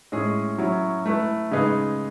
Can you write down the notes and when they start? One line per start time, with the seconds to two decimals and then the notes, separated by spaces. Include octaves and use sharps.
0.12 A2 G#3 C#4 G#4
0.58 F#3 C#4 E4
1.06 A3 E4 B4
1.51 C#3 G#3 D#4 G#4 B4